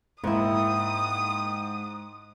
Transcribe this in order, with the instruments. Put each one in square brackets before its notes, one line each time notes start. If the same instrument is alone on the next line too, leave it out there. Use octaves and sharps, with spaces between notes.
[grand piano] G#2 [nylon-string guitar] A#3 E4 [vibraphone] D#4 G5 [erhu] D#6